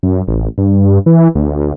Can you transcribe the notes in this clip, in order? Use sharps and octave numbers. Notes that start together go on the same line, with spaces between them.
F#2
A1
G2
E3
D2